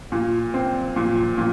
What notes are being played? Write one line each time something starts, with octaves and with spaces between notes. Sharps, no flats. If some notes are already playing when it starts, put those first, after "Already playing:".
A#2
C4
A#2
A#2